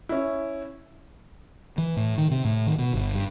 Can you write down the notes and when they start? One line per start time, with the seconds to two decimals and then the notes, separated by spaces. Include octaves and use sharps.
0.09 C#4 E4
1.78 E3
1.97 A2
2.18 D#3
2.31 C3
2.45 A2
2.67 D#3
2.78 B2
2.94 G1
3.14 G2